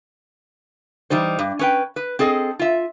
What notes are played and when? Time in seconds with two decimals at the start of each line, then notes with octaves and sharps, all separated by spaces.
1.10 E3 G3 D#4 C5
1.39 G2
1.59 C#4 B4 G5
1.96 B4
2.19 C4 G#4 A4 D#5
2.59 F4 E5